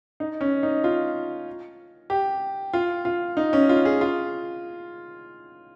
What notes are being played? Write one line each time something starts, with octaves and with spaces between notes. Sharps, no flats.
D#4
C#4
D#4
F4
G4
F4
F4
D#4
C#4
F4
G#4
F4